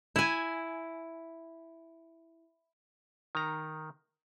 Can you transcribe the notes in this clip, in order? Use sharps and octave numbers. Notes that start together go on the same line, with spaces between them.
E4 G#5
D#3 A#5